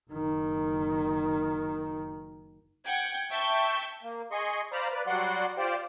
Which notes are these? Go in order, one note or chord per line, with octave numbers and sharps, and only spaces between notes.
F#1 D#3
F#5 G5 G#6
E5 G5 A5 C#6 G6
A#3
G#4 D#5 C6 C#6
C5 D5 F5 A#5 B5
B4 D5
F#3 G3 F#4 D5 F#5 C6
F4 G4 C5 D5 G5